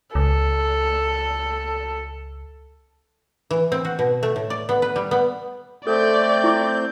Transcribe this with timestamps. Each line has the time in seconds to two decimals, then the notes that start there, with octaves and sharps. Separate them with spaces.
0.15 C#2 A4
3.51 E3
3.72 C4
3.85 F#4
3.99 B2
4.23 A3
4.36 A2
4.50 D5
4.69 B3
4.82 B4
4.96 G3
5.11 B3
5.87 A3 C4 A4 D5 G6
6.44 E4 C#6 D6